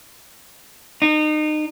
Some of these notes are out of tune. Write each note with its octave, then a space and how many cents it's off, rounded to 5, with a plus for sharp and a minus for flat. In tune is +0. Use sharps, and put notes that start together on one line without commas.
D#4 -30